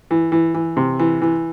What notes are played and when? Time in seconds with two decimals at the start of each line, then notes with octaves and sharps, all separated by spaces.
0.11 E3
0.32 E3
0.54 E3
0.77 C3
0.99 E3
1.22 E3